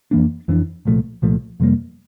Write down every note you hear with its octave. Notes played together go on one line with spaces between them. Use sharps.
F2 E3 A#3 D4
F2 E3 A#3 D4
C2 A#2 F3 A3
C2 A#2 F3 A3
F2 C3 G3 A#3